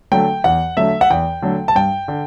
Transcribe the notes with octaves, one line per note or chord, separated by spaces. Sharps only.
D3 F#3 A3 G5
E2 F#5
D3 F#3 A3 E5
F#5
E2 G5
D3 F#3 A3
A5
G2 G5
D3